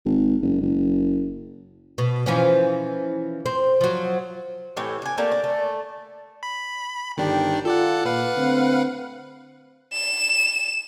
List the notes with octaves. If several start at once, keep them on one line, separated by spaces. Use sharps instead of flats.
G#1
F#1
F#1
B2
E3 F3 C#4
C4
F3 F#3
A2 E3 G4
D4 G#5
A3 A#3 G4 D5
D4
A3
B5
G1 D#3 D4 G4 G5
F4 A4 D5 F#5
A#2 B4 F5 F#5
D3 A3 C4
E7